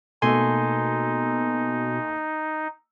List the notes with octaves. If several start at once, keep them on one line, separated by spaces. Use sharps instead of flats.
B2 A3 A#3 D#4 A4 G#5 C6